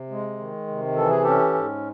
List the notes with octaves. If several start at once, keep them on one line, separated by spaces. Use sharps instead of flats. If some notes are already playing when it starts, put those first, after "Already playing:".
Already playing: C3
G#3
D#3
C3
E3 A4
G#4
C#4 G4 A4
G#2